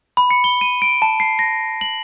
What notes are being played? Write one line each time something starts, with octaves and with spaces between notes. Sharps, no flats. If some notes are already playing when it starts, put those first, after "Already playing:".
B5
C#7
G7
D#7
D7
A5
C7
A#6
F#7